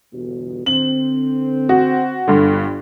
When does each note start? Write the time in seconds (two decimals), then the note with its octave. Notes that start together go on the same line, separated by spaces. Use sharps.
0.13 G1 E2 B2
0.66 D3 C4 F#7
1.69 F#4
2.28 G1 G2 D3